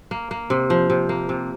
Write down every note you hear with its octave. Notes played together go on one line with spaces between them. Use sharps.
A#3
A#3
C3
F3
C3
A#3
C3